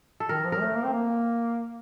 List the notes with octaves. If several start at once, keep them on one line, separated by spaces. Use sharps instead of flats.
A4
D#3 A#4
F3
A#4
A3
A#3
C4
A#3